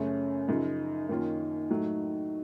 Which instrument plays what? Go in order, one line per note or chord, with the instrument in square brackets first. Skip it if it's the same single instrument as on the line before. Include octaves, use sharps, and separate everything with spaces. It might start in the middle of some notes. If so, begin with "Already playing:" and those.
Already playing: [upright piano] F#2 C#3 A3 [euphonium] C#4
[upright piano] F#2 C#3 F3 [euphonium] D#4
[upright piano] F#2 D#3 A#3 C#4 F4 [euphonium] D#4
[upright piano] A2 F#3 A3